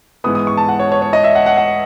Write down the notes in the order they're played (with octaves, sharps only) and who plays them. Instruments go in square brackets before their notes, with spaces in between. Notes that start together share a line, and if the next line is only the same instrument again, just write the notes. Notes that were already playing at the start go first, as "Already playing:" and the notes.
[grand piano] G#2 E3 B3 D#6
D#6
C#6
A5
F#5
C#5
C#5
C#5
D#5
E5
F#5
F#5
F#5